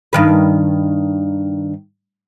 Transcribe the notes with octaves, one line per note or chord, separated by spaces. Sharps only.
G2 D#3 B4